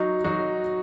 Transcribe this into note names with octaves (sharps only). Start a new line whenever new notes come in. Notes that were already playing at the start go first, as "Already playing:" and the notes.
Already playing: F#3 D#4 F#4
F#3 D#4 F#4